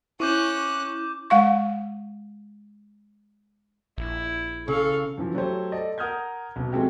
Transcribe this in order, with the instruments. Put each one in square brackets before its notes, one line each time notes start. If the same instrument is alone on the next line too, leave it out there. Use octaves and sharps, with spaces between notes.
[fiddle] C#4 F#6 [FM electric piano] E4 [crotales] C#6 D6 G6
[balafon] G#3 F5 C#6
[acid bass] A#1 [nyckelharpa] E4
[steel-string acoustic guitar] C#3 [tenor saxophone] A4 [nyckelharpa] F5 C#6
[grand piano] F#2 E3 F3
F#3 A3 G4 A4 C5 C#5
A4 D5 D#5
A#4 F#5 D#6 F6 G6 G#6
B1 B2
F3 G#3 A3 C4 F#4 G4